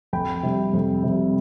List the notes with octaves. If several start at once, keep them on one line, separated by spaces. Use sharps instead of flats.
F2 G5 B5
C3 G3
F2
C3 G3